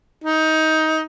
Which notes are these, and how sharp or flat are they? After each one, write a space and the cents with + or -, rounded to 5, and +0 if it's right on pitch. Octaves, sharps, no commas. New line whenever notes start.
D#4 +20